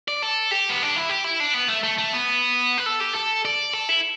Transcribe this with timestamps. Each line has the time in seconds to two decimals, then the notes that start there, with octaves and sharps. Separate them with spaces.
0.08 D5
0.23 A4
0.52 G4
0.70 B3
0.83 D4
0.96 E4
1.10 G4
1.24 E4
1.40 D4
1.54 B3
1.68 A3
1.83 A3
1.98 A3
2.13 B3
2.78 B4
2.86 A4
3.00 G4
3.15 A4
3.45 D5
3.74 A4
3.89 E4